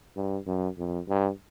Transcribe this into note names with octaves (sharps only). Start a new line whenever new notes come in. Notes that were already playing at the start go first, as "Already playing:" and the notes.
G2
F#2
F2
G2